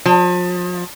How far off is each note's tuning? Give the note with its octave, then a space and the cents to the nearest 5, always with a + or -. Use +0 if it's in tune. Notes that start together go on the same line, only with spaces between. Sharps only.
F3 +35